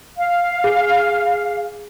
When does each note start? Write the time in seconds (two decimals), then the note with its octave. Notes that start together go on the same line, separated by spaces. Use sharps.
0.16 F5
0.64 G#4